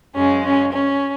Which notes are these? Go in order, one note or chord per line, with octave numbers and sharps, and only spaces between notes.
F#2 C#3 G#3 C#4
C#4
C#4